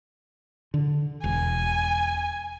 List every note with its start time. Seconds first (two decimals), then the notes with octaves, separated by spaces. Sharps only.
0.74 D3
1.24 E1 G#5